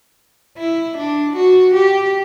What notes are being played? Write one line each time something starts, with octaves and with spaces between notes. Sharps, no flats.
E4
D4
F#4
G4